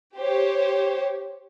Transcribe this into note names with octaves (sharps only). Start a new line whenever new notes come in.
G4 C5 C#5